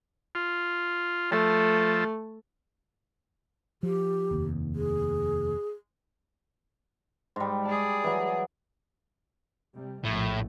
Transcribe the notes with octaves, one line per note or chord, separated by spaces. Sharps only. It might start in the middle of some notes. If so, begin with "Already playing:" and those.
F4
F3 A3 A4
F3 G4
F1 D#2
G#4
G#2 G3
G#4 D5 A5
E3 F#3
C3 G3
F1 A#1 A2 A3